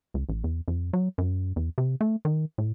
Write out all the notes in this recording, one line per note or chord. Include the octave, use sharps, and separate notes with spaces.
C#2
A1
E2
F2
F#3
F#2
E2
C3
A3
D#3
A2